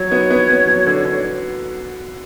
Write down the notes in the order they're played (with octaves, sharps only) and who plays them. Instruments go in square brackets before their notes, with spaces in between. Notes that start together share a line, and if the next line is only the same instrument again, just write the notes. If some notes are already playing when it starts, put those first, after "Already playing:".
Already playing: [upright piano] F#3 [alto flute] C#5
[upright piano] B3
B3
B3
F#3
D3
D3